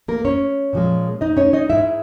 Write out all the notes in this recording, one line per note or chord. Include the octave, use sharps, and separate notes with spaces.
A#3 A#4
C#4 C#5
A#2 F3 G#3
D#4 D#5
C#4 C#5
D#4 D#5
G#2 D#3 G#3 E4 E5